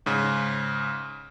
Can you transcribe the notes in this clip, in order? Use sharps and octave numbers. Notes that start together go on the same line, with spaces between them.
G#2 C#3